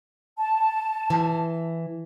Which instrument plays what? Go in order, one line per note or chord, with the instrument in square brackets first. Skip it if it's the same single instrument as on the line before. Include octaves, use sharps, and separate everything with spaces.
[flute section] A5
[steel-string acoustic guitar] E3